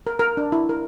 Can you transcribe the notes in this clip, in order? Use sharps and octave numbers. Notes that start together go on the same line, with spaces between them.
A#4
A#4
D4
E4
A#4